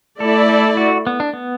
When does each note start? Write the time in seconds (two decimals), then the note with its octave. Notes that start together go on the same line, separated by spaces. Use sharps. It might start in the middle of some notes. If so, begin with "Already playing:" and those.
0.20 A3 E4 A4 D5
0.49 A4
0.77 F#4
1.07 B3
1.20 D4
1.33 B3